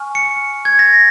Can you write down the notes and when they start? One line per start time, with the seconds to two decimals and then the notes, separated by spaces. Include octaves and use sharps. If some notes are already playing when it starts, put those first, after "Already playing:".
Already playing: G#5 C#6 F6
0.15 C#7
0.65 G#6
0.79 A#6